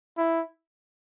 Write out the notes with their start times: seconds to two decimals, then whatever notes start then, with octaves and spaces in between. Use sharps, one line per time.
0.17 E4